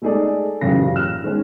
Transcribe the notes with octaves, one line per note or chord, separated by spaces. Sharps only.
G#3 A3 D#4 G#4 A4 D5
A1 F#2 A#2 C#3 A#6
F6 F#6 E7
D#3 G#3 C#4